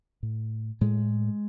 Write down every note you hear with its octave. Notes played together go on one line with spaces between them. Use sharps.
A2
A2 G#3